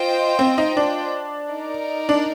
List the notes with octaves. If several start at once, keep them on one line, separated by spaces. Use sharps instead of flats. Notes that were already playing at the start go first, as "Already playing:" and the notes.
Already playing: F4 C5 D#5 G5
C4
D#4
D4
D#4 A#4 D5
D4